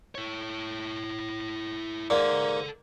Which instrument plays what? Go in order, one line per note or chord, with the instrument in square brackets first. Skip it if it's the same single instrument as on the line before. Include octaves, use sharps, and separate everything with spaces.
[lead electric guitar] E4 C#5
[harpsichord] G#2 A#3 [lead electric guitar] A4 F#5 [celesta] D5